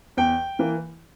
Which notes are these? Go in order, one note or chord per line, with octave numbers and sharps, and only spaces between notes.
E2 G5
E3 A#3